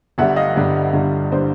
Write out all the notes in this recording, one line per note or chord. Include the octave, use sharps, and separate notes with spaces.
G1 G2 D3 G3 E5 F#5
D#5 F5
G1 G2 D3 G3
G1 G2 D3 G3
D3 G3 C5 D5